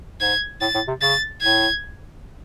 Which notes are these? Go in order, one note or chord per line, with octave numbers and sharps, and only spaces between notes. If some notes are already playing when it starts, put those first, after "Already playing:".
G#2 G#6
A2 A6
A2
C3
C#3 A6
A2 G#6